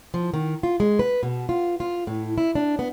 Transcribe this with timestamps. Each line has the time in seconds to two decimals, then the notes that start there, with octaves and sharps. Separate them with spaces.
0.14 F3
0.34 D#3
0.63 F4
0.80 G#3
0.99 B4
1.23 B2
1.49 F4
1.80 F4
2.07 A2
2.38 E4
2.55 D4
2.79 B3